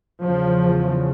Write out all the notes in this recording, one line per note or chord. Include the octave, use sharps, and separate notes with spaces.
E2 C#3 F3